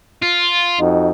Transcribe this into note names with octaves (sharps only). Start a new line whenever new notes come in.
F4
F2 D#4 F#4